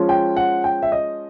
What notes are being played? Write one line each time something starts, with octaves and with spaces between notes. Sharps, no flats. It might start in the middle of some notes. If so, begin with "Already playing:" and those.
Already playing: F3 G#3 C#4 F4
G5
F#5
G5
E5
D#5